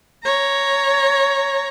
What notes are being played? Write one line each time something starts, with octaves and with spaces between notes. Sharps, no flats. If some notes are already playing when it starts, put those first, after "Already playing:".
C#5 A#5